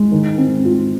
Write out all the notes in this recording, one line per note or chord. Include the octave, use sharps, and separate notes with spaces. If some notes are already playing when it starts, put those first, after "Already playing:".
Already playing: G#3
D#3
C4
F4